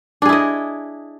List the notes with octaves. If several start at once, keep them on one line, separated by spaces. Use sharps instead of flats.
D4 E4 G#4 D#5